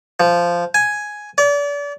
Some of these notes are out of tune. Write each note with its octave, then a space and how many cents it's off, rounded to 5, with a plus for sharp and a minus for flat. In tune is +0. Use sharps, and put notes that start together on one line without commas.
F3 -10
G#5 +5
D5 -35